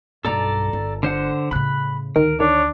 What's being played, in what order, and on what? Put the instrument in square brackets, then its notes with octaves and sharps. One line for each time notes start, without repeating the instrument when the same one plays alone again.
[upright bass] B1 G2 [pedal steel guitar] A4 D5 A#5
[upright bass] G1
[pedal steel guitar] D3 C5 F#5
[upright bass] A2 C#3 [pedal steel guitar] B5 F#6
[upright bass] D2 [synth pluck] D#3 [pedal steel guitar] A#4
[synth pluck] D#3 [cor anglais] D4 [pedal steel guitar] C#5